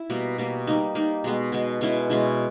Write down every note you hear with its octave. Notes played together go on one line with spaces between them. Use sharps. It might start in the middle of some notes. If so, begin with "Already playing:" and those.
Already playing: E4
B2 G3 A#3
B2 G3 A#3
G3 A#3 D#4
G3 A#3 D#4
B2 G#3 B3
B2 G#3 B3
B2 G#3 C#4 E4
B2 G#3 C#4 E4